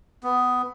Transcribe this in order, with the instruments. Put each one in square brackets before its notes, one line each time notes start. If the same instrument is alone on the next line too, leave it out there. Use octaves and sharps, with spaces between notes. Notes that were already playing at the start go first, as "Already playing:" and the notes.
[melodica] B3